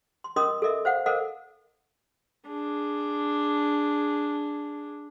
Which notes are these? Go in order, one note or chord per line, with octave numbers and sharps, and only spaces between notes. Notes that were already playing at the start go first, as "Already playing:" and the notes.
C6
C#4 A#4 D#5 C6 D6 D#6
A4 A#4 D#5 E5
C5 F5 F#5
A4 A#4 C5 D#5 F5 F#5
D4 G#4